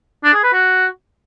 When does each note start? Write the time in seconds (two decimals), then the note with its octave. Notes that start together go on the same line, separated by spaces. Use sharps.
0.24 D4
0.34 G#4
0.43 B4
0.53 F#4